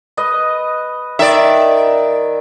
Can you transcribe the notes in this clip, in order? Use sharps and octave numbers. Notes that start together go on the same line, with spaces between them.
B4 D#5
D#3 D5 E5